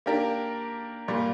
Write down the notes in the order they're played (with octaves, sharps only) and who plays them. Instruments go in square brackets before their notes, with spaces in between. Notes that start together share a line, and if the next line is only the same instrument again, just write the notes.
[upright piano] A#3 D4 G4 A#4
A#2 G3 A#3